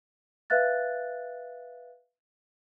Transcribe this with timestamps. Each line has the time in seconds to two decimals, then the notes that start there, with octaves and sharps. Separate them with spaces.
0.50 B4 E5 F5 F#6 A6